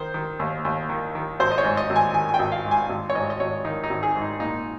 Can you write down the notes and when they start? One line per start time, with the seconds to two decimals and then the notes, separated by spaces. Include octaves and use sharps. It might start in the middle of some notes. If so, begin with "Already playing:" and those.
Already playing: D#3 C5
0.14 D#3
0.39 D#2
0.65 D#2
0.89 D#3
1.15 D#3
1.40 G#1 C5
1.51 D#5
1.58 C#5
1.64 G#2
1.77 D#5
1.90 G#1
1.96 G#5
2.14 D#3 G#5
2.29 G#5
2.34 G5
2.39 G#1
2.52 F5
2.65 G#2
2.71 G#5
2.89 G#1
3.10 C#5
3.15 G#2 D#5
3.30 D#5
3.40 G#1 C#5
3.65 D#3 D#4
3.84 D#4
3.90 G#1
4.03 G#4
4.15 G#2
4.21 D#4
4.40 A#2 D#4